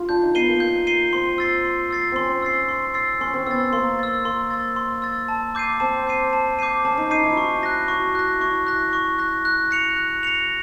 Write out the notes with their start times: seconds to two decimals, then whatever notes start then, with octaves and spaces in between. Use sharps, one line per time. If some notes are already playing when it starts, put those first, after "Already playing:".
Already playing: F4
0.09 D4 G6
0.22 D#4
0.34 B3 C7 D#7 G7
0.48 A#3
0.60 A#3 G6
0.87 C7 D#7 G7
1.13 C4 C6
1.38 E6 A6 C7
1.65 C6
1.90 E6 A6 C7
2.12 C4 C#4 C6
2.42 E6 A6 C7
2.69 C6
2.94 E6 A6 C7
3.21 C#4 C6
3.34 C4
3.47 B3 E6 A6
3.72 A#3 C6
3.99 E6 A6
4.25 A#3 C6
4.51 E6 A6
4.76 C6
5.02 E6 A6
5.28 A5
5.55 D6 G6 C7 D#7
5.80 C4 A5
6.07 D6 G6 C7 D#7
6.33 A5
6.59 D6 G6 C7 D#7
6.84 C#4 A5
6.98 D#4
7.10 D#4 D6 G6 C7 D#7
7.23 E4
7.36 F#4 C#6
7.63 F#6 A#6
7.88 F#4 C#6
8.15 F#6 A#6
8.40 E4 C#6
8.67 F#6 A#6
8.93 C#6
9.18 F#6 A#6
9.45 F#6
9.71 A#6 C#7 F7
9.96 F#6
10.23 A#6 C#7 F7